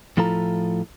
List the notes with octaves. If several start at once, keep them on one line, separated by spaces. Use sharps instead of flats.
A2 F3 E4 F4 A4 A#5